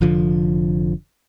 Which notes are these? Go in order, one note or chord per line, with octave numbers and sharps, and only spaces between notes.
F1 F2 D3 F3